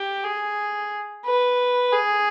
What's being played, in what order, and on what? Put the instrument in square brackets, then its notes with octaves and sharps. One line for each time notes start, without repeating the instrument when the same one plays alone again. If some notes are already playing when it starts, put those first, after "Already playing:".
Already playing: [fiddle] G4
G#4
B4
G#4